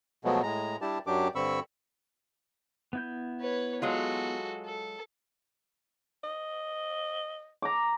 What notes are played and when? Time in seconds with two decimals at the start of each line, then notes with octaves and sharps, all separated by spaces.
0.25 B2 F3 F#3 G#3 A3 B3
0.43 A2 G#3 A#5
0.81 G3 D4 E4 G4 A5
1.07 F#2 F#3 D4 G4 D6
1.35 G2 D3 C4 B5 C#6 E6
2.93 B3 E4 G6
3.41 B4 C#5
3.82 F#3 G#3 F4 F#4 A4
4.65 A4
6.24 D#5
7.62 A#5 D6